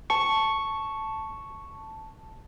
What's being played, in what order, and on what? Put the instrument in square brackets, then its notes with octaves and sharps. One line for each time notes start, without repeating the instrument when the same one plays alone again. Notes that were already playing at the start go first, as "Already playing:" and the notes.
[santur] A5 [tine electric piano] C#6